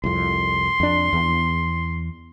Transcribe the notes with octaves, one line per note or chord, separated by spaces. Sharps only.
C2 F2 C6
F2 D4
E2